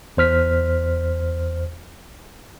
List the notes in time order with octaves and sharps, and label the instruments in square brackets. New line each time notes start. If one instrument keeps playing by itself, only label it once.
[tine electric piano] E2 C5 F6 B6